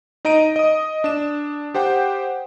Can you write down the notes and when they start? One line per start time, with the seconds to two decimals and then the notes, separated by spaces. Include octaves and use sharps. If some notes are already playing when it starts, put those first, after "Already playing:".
0.25 D#4 D#5 A#5 D7 D#7
0.56 D#5 D#6
1.04 D4 E7
1.74 G4 C5 F#5 G5